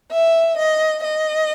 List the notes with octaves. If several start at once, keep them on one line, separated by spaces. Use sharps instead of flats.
E5
D#5
D#5